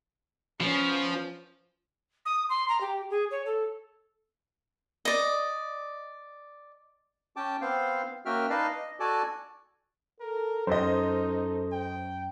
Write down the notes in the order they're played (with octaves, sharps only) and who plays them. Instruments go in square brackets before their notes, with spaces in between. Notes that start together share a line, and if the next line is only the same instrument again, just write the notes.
[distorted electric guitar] F3 [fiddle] B3 C#4
[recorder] D#6
C6
A#5
G4
G#4
C#5
A4
[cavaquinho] D5 D#5
[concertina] C#4 G5 A5 D6
B3 C4 C5 F5
A#3 C#4 F#4 E5 G5 F6
D#4 B4 D5 D#5 F5 A5
D#5
F#4 A4 D5 G#5 A5 D6
[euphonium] A4 [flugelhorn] A#4
[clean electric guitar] F#2 [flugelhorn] D#4 [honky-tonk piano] C5 D#5
[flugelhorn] G5